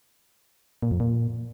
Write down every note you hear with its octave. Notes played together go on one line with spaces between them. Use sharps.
A#2
F2
A#2